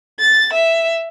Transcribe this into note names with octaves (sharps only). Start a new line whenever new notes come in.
A6
E5